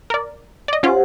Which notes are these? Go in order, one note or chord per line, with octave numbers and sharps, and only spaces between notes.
A#4 D5
D5 D#5
C#4 F4 G4 C5 F#5